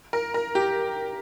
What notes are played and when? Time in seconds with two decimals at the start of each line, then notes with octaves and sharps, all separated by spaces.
0.13 A#4
0.34 A#4
0.55 G4